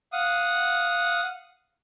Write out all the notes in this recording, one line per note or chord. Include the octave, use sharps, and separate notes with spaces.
F5 F#5 D#6